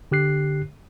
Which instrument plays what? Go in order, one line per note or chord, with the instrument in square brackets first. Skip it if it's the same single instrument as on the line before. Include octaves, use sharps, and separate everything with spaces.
[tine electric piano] D3 G4 F#6 C7